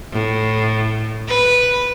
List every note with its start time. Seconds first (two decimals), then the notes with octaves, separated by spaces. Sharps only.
0.13 A2
1.28 B4